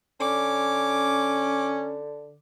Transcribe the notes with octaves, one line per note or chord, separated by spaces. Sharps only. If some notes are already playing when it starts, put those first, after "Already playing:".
D3 C#4 D6